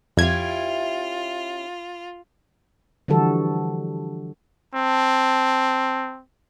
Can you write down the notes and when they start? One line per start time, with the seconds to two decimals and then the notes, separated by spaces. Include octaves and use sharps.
0.17 F2 C#4 E4 F4 G4 G#6
3.08 D3 E3 F3 G3 F#4 A4
4.75 C4 A5